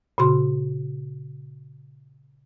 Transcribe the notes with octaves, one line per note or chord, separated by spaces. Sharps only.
A#2 C#3 F#4 C6